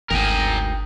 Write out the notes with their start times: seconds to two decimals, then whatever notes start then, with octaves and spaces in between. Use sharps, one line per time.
0.11 G1 D2 G#2 A#4 G5 G#5 D#6